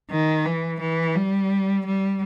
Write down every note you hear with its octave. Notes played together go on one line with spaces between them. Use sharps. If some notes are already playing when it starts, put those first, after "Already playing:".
D#3
E3
E3
G3
G3